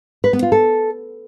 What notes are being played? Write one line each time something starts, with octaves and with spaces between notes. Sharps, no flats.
B4
B3
F4
A4